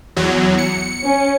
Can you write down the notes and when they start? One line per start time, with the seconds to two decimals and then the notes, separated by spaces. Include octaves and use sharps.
0.17 E2 F#3
0.58 C#7
1.04 C#4